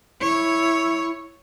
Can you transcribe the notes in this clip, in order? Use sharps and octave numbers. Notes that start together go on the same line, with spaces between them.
E4 C#5